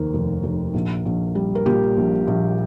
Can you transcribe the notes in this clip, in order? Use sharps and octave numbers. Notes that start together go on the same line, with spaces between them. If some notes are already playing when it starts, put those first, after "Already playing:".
Already playing: F1 D#2 D#3 A#4 C5
F1
F1
A#1
A#1
G3
A#4
A#2 G4
A#1
A#1